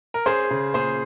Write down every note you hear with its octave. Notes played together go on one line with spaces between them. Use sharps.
A#4
C#4 G#4 C5
C#3
A#2 G#4 C5